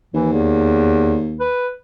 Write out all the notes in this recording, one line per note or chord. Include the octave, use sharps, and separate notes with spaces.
D#2 E3
E2
B4